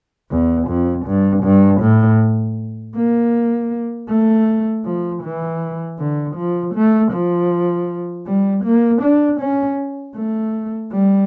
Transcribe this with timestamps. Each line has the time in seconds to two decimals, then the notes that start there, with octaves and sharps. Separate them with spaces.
0.31 E2
0.68 F2
1.06 G2
1.44 G2
1.81 A2
2.96 A#3
4.09 A3
4.85 F3
5.23 E3
5.99 D3
6.36 F3
6.75 A3
7.12 F3
8.27 G3
8.64 A#3
9.02 D4
9.40 C#4
10.16 A3
10.92 G3